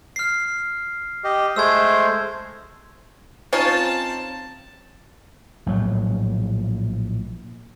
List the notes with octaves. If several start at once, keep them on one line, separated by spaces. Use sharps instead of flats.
F6 C7
G4 D#5
G#3 A3 C5 E6 G#6
C4 C#4 D#4 F4 A5
A#1 A2 F#3